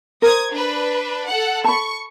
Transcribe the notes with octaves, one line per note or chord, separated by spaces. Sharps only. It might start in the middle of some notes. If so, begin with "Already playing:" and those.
A#4 C5 D#6 G#6
D4 B4
A4 F#5
A5 B5 C#6